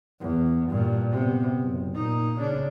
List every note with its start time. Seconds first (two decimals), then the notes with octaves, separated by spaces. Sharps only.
0.20 E2
0.71 G2 A#2
1.12 C3 B3
1.61 F#1
1.95 A#2 D#4
2.38 C#3 D4